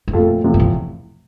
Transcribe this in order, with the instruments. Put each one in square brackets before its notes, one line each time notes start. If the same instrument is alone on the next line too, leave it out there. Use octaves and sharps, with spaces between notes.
[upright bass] G2
[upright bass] F2 [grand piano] A#2 A3 C4 F4 A4
[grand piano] E2 C3 F3 A3
[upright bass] G2
A2